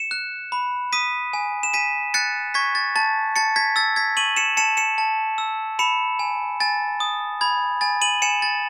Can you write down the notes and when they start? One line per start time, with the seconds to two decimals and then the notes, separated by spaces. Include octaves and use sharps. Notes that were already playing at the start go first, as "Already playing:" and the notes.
Already playing: C#7 E7
0.11 F#6
0.52 B5
0.93 D#6 B6 D#7
1.33 G#5
1.63 E7
1.74 G#5 B6 D#7
2.14 F#6 A6 C#7
2.54 C#6 G#6 B6
2.75 A6
2.96 A5 A6
3.36 A5 A6 C#7
3.56 G#6 B6
3.76 E6 A6
3.96 G#6 B6
4.17 C#6 D#7 F#7
4.36 C#7 E7
4.57 A5 C#7 E7
4.77 C#7 E7
4.98 A5
5.38 E6
5.79 B5 C#7 E7
6.19 G#5
6.60 G#5 A6
7.00 D#6
7.41 B5 G#6
7.81 G#5 A6
8.01 D#7 F#7
8.22 G#5 C#7 E7
8.42 A6